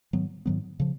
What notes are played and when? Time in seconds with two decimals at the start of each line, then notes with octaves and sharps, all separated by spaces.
0.13 G#2 D#3 F#3 B3
0.46 G#2 D#3 F#3 B3
0.80 C#3 F3